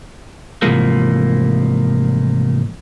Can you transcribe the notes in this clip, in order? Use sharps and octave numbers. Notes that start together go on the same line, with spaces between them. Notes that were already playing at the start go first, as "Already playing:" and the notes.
G#2 C3 E3 F3 A3 A#3